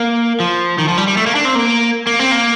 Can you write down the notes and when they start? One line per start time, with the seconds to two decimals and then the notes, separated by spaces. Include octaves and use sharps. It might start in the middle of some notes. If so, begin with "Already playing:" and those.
Already playing: A#3
0.40 F3
0.78 D#3
0.88 F3
0.98 G3
1.08 G3
1.17 A3
1.26 A#3
1.35 D4
1.45 C4
1.55 A#3
2.07 A#3
2.19 C4
2.31 A#3